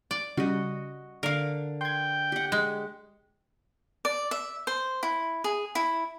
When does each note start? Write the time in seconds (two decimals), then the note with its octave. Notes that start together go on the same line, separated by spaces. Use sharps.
0.11 D5
0.37 C#3 G3 F#4 D#5
1.23 D3 A#4 F5
1.81 G5 C6 G#6
2.32 G4 F#5
2.52 G#3
4.05 D5
4.31 E5
4.67 C5
5.03 E4
5.44 G#4
5.75 E4